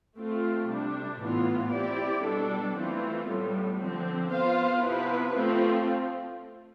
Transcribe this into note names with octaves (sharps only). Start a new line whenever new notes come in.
A3 C4 F4
C3 G3 D4
A2 E3 B3 F4
C4 E4 G4 D5
B2 G3 D4 A4
E3 A3 C4 F4
A2 G3 B3
D3 F3 C4
B3 F4 C5 F5
C3 F3 B3 E4 B4
F3 A3 C4 F4